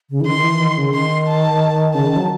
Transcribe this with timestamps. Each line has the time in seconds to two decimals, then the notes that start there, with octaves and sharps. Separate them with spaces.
0.10 C#3
0.21 E3
0.26 D#3 C6
0.37 D#3
0.44 E3
0.60 D#3
0.77 C#3
0.94 D#3 C6
1.28 A5
1.94 C#3 A5
2.06 D#3
2.16 F#3